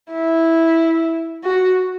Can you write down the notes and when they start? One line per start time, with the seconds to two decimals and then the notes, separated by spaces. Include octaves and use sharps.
0.12 E4
1.43 F#4